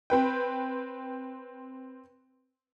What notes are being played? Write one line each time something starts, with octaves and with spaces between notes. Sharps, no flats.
C4 B4 G5